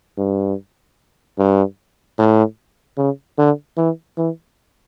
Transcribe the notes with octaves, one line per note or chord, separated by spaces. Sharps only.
G2
G2
A2
C#3
D3
E3
E3